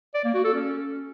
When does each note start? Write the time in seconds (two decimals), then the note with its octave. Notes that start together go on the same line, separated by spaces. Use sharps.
0.15 D5
0.25 A#3
0.34 F#4
0.44 A4
0.54 C#4